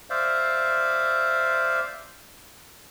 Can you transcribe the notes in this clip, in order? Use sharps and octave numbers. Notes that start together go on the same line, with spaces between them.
C5 D5 E5 F5